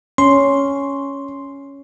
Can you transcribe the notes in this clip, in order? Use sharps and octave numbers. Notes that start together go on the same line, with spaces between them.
C#4 C6